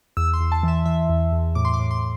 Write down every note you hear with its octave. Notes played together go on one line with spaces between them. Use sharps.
E2 E6
C6
E2
A5
E3 E5
E3 E5
E2
E2
A2 D6
C6
D6
A2
C6